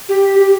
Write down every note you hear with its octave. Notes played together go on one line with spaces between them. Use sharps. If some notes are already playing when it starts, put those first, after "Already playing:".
G4
G4